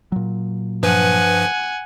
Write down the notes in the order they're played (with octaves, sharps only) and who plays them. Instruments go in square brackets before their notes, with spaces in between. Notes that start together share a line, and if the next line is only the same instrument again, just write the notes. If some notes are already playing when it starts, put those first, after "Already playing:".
[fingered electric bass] A#2 F#3
[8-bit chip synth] G2 F3 B4 [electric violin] F#5 G#5